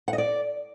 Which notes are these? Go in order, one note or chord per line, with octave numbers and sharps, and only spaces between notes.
F#5
D#5
D5